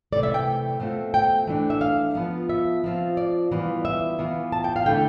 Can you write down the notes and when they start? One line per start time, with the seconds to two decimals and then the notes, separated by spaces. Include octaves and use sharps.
0.12 C3 E3 A3 D5
0.23 E5
0.34 G5
0.80 B2 A3 C4 F4
1.14 G5
1.47 E3 A3 D4
1.70 E5
1.81 F5
2.15 F3 B3 F4
2.49 E5
2.84 F3 C4 F4
3.17 D5
3.52 E3 G3 B3 F4
3.85 E5
4.19 E3 B3 F4
4.52 A5
4.64 G5
4.76 F5
4.86 D3 A3 E4 G5